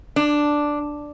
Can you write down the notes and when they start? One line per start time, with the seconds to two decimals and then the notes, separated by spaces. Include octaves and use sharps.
0.16 D4